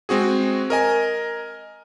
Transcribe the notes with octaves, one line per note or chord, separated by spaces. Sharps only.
G#3 C4 F#4 G#4
A#4 D#5 G#5